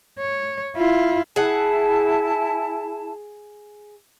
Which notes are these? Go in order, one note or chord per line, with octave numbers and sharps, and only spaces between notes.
C#5
E4 F4
E4 G#4 F#5 A5